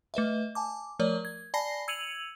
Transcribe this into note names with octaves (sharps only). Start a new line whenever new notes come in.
A3 B4 D#5 E5
G#5 A5 D6
F3 A3 A#4 C#5 D5
G#6
D5 G#5 A5 B5 A#6 C7
E6 G#6 C#7 D#7 F7 F#7